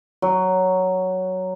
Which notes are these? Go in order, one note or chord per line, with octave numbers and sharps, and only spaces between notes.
F#3